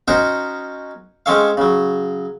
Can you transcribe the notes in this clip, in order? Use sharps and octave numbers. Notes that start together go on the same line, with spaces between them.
C#4 D#4 F#4 A#4 C5 A#5
G#3 C4 C#4 A4 C#5 F5
C#3 F#3